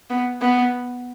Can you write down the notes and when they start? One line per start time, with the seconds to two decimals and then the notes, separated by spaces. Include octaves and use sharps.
0.10 B3
0.41 B3